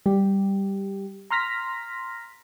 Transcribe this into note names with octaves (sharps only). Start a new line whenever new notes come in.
G3 G4
A#5 C6 F6 A#6 B6